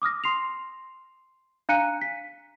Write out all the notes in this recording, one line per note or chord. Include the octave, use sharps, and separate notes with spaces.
D6 D#6 F6 A#6
C6 C7 F7
D4 F5 A#5 F#6 C#7 D#7
B6